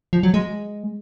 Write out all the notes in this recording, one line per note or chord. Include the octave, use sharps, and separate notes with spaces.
F3
F#3
G#3